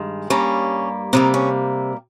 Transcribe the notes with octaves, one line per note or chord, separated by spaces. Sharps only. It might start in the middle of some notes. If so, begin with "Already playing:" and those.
Already playing: G2 D#3 G#3
G2 G3 A#3 C#4
C3 G3 A#3 D#4
C#4